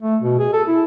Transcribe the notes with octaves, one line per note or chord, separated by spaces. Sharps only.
A3
B2
G#4
A4
E4